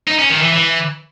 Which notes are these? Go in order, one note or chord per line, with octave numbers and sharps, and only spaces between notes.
D#4
C#4
D#3
E3
E3